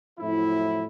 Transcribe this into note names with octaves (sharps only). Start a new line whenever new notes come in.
F2 A2 F#3 C4 E4